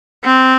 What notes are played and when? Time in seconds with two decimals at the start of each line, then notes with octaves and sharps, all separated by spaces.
0.24 C4